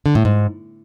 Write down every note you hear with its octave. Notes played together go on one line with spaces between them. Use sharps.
D3
A2
G#2